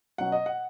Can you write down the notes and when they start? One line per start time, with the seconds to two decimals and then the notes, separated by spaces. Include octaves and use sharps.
0.18 B2 F#3 C#4 F#5
0.32 D#5
0.46 F#5